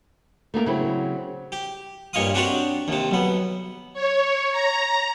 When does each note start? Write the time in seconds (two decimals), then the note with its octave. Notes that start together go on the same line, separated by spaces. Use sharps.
0.54 A3 A#3 G#4 A#4
0.66 C#3 F#3 C4 E4
1.52 G4
2.13 G2 A#2 C#5 D#5 F5 D#6
2.34 C4 D4 F#4 G4 A#4 C#5
2.88 D#2 C3
3.11 B1 B3
3.93 C#5
4.52 A#5